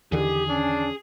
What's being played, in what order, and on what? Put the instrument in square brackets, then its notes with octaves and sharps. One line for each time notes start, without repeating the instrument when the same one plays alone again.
[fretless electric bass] E2 D3 D#3 [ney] G4 [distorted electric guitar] G#4
[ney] C#4 [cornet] D4